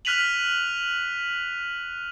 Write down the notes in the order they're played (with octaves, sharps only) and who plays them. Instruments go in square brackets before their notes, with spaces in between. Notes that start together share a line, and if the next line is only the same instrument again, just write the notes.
[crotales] F6 F#6 B6 D#7 F7 F#7